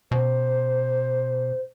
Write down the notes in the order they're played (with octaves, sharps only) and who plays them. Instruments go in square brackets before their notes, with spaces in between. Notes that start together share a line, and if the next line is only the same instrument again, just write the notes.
[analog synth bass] B2 [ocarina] C5